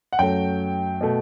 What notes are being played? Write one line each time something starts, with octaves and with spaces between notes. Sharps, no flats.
F#5
F#2 F#3 A3 G5
B2 A3